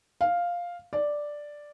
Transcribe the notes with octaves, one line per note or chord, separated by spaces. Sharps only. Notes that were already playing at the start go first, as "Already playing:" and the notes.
F5
D5